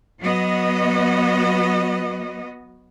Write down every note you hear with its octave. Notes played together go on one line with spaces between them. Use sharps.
F#3 B3 F#4 D#5